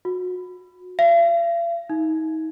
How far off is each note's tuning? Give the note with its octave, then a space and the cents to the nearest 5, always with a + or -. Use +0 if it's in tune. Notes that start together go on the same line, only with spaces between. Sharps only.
F#4 -25
F5 -45
D#4 +35